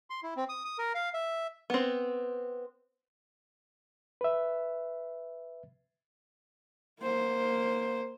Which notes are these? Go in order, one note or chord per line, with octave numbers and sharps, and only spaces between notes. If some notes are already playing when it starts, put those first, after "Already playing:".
C6
E4
C4
D#6
D#6
A#4
F5
E5
B3 C4
B4 E5
A#3 C5